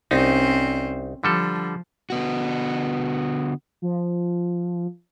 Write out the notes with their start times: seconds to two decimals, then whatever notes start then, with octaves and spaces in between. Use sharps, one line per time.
0.11 C2 C4 C#4 D#4
1.24 D3 F3 G3 A4
2.10 D3 B3 F#4
3.82 F3